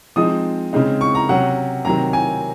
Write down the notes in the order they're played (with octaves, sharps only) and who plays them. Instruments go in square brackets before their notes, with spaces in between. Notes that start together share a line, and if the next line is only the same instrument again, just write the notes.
[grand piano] F3 G#3 C4 D#4 D#6
C#3 G#3 C4 D#4
C#6
A#5
C3 F#3 C#4 F#5
C3 D#3 F#3 C4 A#5
G#5